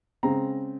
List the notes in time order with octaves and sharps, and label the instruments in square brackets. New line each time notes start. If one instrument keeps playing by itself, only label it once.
[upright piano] C#3 G#3 C4 A#5